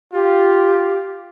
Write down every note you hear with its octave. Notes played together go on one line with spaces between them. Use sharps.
F4 G4